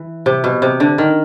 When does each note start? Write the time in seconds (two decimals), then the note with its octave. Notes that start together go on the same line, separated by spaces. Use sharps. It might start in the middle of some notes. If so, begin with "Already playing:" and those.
Already playing: E3
0.26 C3
0.44 B2
0.62 C3
0.80 D3
0.98 D#3